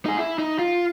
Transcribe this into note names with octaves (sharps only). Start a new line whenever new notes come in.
D#4 G#4
E4
D#4
F4